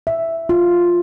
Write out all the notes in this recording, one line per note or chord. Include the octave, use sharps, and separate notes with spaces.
E5
F4